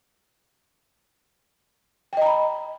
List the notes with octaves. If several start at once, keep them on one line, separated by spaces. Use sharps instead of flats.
D#5 G5 A#5 B5